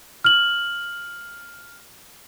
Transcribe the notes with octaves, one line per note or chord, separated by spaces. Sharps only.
F6 F#7